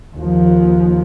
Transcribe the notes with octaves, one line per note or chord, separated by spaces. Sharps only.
D#2 F3